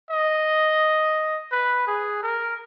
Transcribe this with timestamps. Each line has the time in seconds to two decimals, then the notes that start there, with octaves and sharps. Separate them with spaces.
0.11 D#5
1.52 B4
1.87 G#4
2.23 A#4